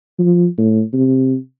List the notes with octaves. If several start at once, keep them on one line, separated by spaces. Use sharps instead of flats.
F3
A2
C3